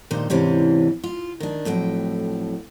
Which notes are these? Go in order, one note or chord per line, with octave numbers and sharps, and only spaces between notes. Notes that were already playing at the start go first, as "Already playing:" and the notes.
G2 A#2 D#3 C5
G#2 C3 E3 C#4 D4
F4
D#3 D4
F2 A2 F#3 G5